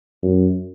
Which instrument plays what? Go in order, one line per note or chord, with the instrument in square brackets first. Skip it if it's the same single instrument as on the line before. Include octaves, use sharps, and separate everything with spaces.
[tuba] F#2